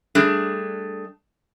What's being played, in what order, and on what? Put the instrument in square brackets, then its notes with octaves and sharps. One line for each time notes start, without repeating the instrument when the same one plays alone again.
[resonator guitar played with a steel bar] G3 A3 D4 G#4